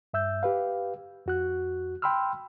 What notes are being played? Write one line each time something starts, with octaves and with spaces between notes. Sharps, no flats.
G2 E5 E6 G6
G4 B4 F5
F2 F#4 F#6
G5 B5 C6 E6 F6